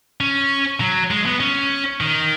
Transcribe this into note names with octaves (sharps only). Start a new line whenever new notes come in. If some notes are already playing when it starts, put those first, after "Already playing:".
C#4
F#3
G#3
B3
C#4
D#3